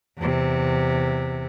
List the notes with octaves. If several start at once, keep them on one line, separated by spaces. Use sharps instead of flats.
E2 C3